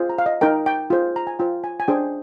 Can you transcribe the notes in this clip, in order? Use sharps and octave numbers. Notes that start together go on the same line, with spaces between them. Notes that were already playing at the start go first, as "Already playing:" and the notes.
Already playing: F4 G#4 C5
A#5
F5
D#5
D#4 A#4 G5
G5
F4 G#4 C5
A#5
G#5
F4 C5 G5
G#5
G#5
D4 G#4 C5 G5